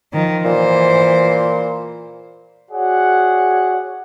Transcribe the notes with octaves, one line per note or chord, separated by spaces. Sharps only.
D#3 F3
A#2 E3 C5
F#4 G#4 C#5 D5 F#5